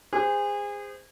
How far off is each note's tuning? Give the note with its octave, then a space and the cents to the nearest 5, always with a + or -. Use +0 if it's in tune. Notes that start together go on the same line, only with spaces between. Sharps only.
G#4 -30 C5 -20